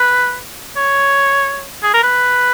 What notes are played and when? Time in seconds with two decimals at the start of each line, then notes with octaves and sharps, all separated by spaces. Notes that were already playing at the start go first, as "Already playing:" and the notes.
Already playing: B4
0.77 C#5
1.83 G#4
1.94 A#4
2.03 B4